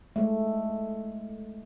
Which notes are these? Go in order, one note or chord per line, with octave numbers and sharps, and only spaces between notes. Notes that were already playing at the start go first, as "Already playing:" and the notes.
G#3 A3